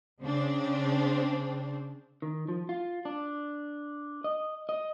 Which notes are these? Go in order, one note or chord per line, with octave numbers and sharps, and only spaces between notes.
C#3 C4 D4
D#3
F3
F4
D4
D#5
D#5